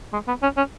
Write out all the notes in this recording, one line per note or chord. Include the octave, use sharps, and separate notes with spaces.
G#3
B3
C#4
C#4